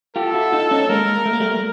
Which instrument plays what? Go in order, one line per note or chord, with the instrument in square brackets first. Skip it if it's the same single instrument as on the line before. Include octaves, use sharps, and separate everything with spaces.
[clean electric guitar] F4 G4 [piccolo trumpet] A4
[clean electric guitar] E4 F#4
D#4 F4
C#4 D#4
[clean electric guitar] G#3 A#3 [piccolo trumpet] A#4
[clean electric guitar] A3
A#3
G3 A3